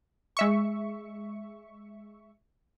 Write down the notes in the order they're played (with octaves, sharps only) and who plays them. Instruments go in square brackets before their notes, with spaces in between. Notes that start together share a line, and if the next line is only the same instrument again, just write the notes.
[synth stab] G#3 E5 C#6